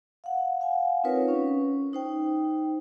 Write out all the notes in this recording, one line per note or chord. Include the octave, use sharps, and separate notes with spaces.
F5 F#5
F5 F#5 G#5
C4 D#4 F4 A#4 B4 C#5
C#4
D#4 C5 G5